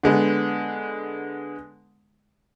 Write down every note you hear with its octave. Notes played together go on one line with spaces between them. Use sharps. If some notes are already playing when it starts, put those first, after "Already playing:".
D3 G#3 B3